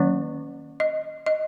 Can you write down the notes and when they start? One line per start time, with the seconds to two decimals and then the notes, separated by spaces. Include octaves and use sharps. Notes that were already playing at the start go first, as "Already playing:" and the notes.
Already playing: D#3 F#3 A#3 C#4 C#5
0.80 D#5
1.26 D#5